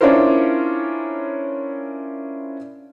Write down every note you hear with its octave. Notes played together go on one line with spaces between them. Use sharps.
C#4 D4 E4 F4 A#4 C5